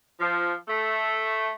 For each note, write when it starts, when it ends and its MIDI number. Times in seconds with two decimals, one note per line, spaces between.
0.20 0.53 53
0.68 1.51 57